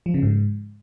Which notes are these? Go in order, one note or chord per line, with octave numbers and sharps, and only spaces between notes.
F3
C#3
G#2